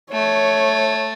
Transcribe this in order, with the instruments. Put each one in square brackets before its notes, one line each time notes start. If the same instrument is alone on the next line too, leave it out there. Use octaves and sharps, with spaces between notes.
[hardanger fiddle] A3 [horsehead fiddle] C#5